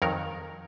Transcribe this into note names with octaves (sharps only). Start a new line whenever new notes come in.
F2 D#3 F#3 A#4 C#5